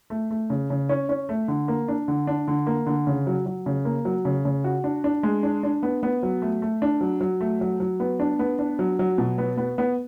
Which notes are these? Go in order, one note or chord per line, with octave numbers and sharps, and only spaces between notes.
A3
A3
C#3
C#3
C#4
C#4
A3
D3
A#3
D4
D3
D4
D3
A#3
D3
C#3
F#3
F#3
C#3
A#3
F#3
C#3
C#3
F#4
D4
D4
G#3
D4
D4
B3
B3
F#3
A3
A3
D4
F#3
F#3
A3
F#3
F#3
B3
D4
B3
D4
F#3
F#3
B2
B3
B3
B3